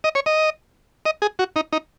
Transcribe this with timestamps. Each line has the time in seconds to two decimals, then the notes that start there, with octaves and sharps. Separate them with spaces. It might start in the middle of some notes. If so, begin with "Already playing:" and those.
0.04 D#5
0.15 C#5
0.26 D#5
1.06 D#5
1.22 G#4
1.39 F#4
1.56 D#4
1.73 D#4